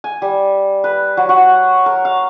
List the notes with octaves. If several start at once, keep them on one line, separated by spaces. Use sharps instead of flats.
G#5
G3
B4
F#3
F#4
A#4
F5